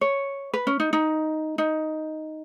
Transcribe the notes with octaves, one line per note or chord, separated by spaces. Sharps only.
C#5
B4
C#4
D#4
D#4
D#4